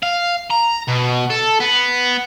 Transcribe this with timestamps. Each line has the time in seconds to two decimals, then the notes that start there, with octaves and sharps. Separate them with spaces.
0.03 F5
0.50 A#5
0.88 B2
1.30 A4
1.60 B3